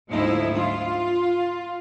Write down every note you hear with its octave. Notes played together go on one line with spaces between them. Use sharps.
D2 G#2 F3 D#4 E4
F4